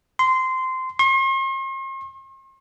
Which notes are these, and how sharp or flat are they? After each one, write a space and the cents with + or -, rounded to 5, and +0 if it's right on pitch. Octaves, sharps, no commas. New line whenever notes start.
C6 -15
C6 +45